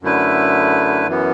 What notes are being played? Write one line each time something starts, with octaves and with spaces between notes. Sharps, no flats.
F#2 D3 A3 E4 B4
F#2 E3 B3